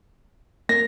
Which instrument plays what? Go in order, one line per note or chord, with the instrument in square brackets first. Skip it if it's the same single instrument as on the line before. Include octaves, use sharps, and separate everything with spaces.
[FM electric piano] A#3 [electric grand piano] A#6